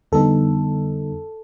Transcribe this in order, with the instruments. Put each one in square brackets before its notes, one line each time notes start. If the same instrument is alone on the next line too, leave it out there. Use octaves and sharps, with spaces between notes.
[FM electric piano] F2 D3 G3 B3 D#4 A4